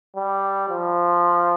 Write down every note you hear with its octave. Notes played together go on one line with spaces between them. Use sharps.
G3
F3